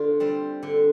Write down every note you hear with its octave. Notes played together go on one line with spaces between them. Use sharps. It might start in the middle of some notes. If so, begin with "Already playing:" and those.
Already playing: D3 F4
G3 C4
D3